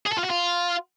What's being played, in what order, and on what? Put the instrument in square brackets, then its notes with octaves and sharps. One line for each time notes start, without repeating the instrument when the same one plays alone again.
[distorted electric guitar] G#4
A4
F4
F#4
F4